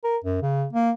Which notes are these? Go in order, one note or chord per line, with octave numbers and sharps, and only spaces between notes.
A#4
F#2
C#3
A#3